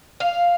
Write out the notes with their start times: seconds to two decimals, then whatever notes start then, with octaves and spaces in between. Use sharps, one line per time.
0.20 F5